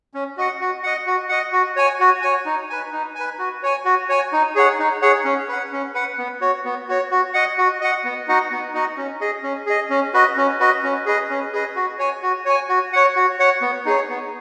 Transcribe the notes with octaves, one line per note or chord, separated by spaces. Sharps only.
C#4
F#4 D#5 F#5
F#4
D#5 F#5
F#4
D#5 F#5
F#4
C#5 G#5
F#4
C#5 G#5
D#4
B4 G#5
D#4
B4 G#5
F#4
C#5 G#5
F#4
C#5 G#5
D#4
G#4 C#5 F#5
D#4
G#4 C#5 F#5
C#4
B4 F#5
C#4
B4 F#5
B3
F#4 C#5
B3
F#4 C#5
F#4
D#5 F#5
F#4
D#5 F#5
B3
D#4 F#4 D#5 F#5
B3
D#4 F#4 D#5 F#5
C#4
G#4 D#5
C#4
G#4 D#5
C#4
F#4 B4 D#5
C#4
F#4 B4 D#5
C#4
G#4 B4 D#5
C#4
G#4 B4 D#5
F#4
C#5 G#5
F#4
C#5 G#5
F#4
C#5 F#5
F#4
C#5 F#5
B3
D#4 G#4 C#5
B3